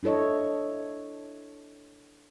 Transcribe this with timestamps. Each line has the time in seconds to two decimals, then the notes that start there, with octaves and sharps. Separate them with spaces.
0.03 D4 E4 A4 C#5 D#5